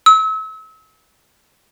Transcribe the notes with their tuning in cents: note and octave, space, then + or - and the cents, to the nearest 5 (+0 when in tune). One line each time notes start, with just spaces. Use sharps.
E6 -35